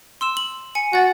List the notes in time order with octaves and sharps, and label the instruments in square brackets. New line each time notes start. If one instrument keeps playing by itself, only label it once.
[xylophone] C6 E6 E7
F#7
G#5 C#7
[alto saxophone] F#4 [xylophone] F#5 A6